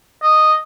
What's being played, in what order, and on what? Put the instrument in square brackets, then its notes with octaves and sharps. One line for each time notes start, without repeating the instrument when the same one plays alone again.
[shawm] D#5